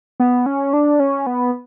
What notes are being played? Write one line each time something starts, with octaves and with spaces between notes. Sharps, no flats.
B3
C#4
D4
C#4
B3